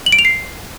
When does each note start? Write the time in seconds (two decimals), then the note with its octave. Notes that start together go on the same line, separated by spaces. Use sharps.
0.06 F#7
0.12 D7
0.19 F7
0.25 C7